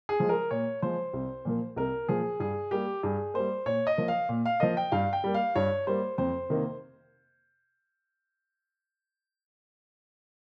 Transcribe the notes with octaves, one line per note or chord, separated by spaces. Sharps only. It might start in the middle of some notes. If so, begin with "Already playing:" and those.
G#4
F3 G#3
A#4
A#2 C#5
F3 G#3 C5
C2
A#2 F3 A#3
C2 A#4
A#2 F3 A#3 G#4
G2 G#4
G3 A#3 G4
G2 G#4
G3 A#3 C5
A#2 C#5
D#5
F3 A#3
F5
A#2
F5
F3 A#3 D#5
G5
G2 F5
G5
G3 A#3
F5
G2 C#5
G3 A#3 C5
F2 C5
C3 D#3 A#3